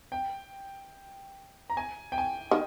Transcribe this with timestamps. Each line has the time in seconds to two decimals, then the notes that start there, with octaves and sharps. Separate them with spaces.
0.12 G5
1.70 A#5
1.77 G#5
2.12 G5
2.18 G#5
2.51 D#3